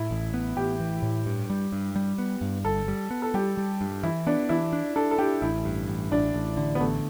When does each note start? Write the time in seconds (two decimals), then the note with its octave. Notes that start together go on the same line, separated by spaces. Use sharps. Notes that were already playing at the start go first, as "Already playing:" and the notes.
Already playing: A2 E4
0.11 A1
0.34 B3
0.57 A1 G4
0.80 E3
1.02 A2
1.26 G2
1.50 G3
1.73 G2
1.95 G3
2.18 B3
2.41 G2
2.65 G1 A4
2.88 G3
3.11 B3
3.22 A4
3.34 G3 G4
3.57 G3
3.81 G2
4.03 E3 E4
4.27 B3 D4
4.49 E3 E4
4.73 D4
4.96 D4 A4
5.11 A4
5.18 D4 G4
5.42 A1 E4
5.65 G2
5.88 A1
6.11 A1 D4
6.34 A1
6.57 D3
6.75 B3
6.80 A1 A3